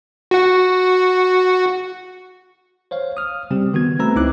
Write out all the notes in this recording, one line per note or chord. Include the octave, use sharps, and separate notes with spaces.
F#4 F#5
C5 C#5 F5
D#6 F6
C#3 G3 C4 G4
D#3 B3 F#4 G#6
A3 C4 B4 A#5 E6
C#2 C4 D#4 E4 D6 F#6